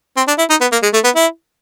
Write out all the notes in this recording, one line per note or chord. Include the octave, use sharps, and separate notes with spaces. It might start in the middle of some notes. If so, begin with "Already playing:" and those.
C4
D4
E4
D#4
B3
A#3
G#3
A3
B3
E4